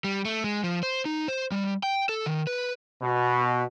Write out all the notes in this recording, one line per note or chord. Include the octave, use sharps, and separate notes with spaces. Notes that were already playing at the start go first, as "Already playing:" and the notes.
G3
A3
G#3
F3
C5
D#4
C5
G3
G5
A4
D#3
B4
B2